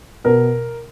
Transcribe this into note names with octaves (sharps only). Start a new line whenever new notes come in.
B2 A#4